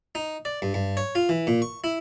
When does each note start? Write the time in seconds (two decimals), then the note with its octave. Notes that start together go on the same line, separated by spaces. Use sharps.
0.15 D#4
0.45 D5
0.62 G2
0.74 G2
0.97 C#5
1.15 F4
1.29 E3
1.47 A#2
1.62 C#6
1.84 E4